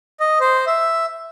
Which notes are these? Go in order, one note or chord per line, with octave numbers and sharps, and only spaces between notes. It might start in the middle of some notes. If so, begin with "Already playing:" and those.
D#5
C5
E5